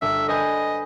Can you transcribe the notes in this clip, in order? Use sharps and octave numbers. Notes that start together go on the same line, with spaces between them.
G1 E5
B4 C5 D#5 G#5